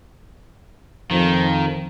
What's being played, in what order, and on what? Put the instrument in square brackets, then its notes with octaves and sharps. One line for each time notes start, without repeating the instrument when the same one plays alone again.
[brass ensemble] F2 F3 [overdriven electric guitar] D#3